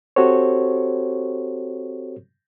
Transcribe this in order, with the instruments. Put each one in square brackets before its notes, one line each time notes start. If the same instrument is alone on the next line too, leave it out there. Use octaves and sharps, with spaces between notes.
[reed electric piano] C4 F#4 G4 A4 C5 C#5